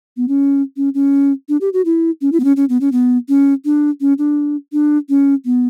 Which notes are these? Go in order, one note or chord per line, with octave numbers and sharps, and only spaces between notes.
B3
C#4
C#4
C#4
D4
G4
F#4
E4
C#4
E4
B3
C#4
C#4
B3
C#4
B3
C#4
D4
C#4
D4
D4
C#4
B3